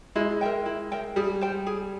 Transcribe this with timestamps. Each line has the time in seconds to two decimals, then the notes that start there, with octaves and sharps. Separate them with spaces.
0.15 G#3 E4
0.41 A#4 E5 G5
0.66 E4
0.92 A#4 E5 G5
1.16 G3 G#4
1.41 C5 G5
1.66 G#4